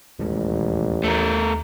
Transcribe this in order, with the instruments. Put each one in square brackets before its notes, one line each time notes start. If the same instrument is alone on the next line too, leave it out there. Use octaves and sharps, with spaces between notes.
[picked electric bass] E1 D#2 G#3 [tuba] A1
[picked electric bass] D#2 [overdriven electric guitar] A3 A#4